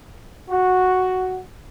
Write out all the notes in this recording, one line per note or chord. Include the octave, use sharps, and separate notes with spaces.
F#4